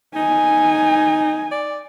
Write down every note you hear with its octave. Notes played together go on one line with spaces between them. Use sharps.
D#4 G#5
D5